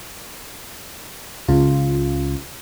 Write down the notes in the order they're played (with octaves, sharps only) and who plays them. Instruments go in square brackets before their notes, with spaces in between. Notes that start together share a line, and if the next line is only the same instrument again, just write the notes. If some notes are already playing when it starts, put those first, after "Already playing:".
[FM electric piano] C#2 C#3 F4